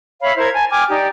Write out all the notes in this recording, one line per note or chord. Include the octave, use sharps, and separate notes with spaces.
C#5 E5 F5 B5
E4 A#4 C5 G#6
G#5 A5
G5 G#5 D6 F6
D#4 G4 D5